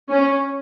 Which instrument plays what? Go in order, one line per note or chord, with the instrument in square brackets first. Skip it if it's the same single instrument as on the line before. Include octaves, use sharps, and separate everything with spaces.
[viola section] C#4